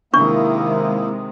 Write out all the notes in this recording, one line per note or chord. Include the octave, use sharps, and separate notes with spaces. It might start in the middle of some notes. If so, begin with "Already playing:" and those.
C3 D#3 G#3 A#3 D4 E4 C#6